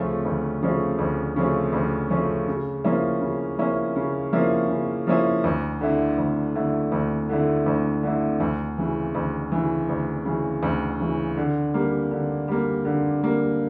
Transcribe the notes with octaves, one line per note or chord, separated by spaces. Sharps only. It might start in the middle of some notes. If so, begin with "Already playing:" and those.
Already playing: D2 C#3 F3 A3 C#4
D2
C#3 F3 A3 C#4
D2
C#3 F3 A3 C#4
D2
C#3 F3 A3 C#4
C#3
F3 A#3 C#4 E4
C#3
F3 A#3 C#4 E4
C#3
F3 A#3 C#4 E4
C#3
F3 A#3 C#4 E4
D2
D3 A3 E4
D2
D3 A3 E4
D2
D3 A3 E4
D2
D3 A3 E4
D2
C#3 E3
D2
C#3 E3
D2
C#3 E3
D2
C#3 E3
D3
G3 A#3
D3
G3 A#3
D3
G3 A#3